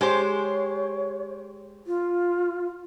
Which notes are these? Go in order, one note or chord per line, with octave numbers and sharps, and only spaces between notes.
G#3 G4 C5 C#5
F4